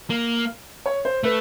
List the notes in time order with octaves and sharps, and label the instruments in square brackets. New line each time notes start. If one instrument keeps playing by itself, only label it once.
[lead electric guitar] A#3
[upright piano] C#5
C5
[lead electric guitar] A3 [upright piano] B4